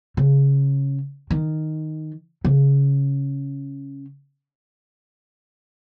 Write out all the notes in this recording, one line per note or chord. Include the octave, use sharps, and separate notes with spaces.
C#3
D#3
C#3